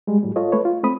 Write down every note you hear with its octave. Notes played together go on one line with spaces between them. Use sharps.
G3 G#3
A2 F#3 G3
F4 A4 C#5 D#5
A3 B4 C#5
F4
A3 C4 B5 D#6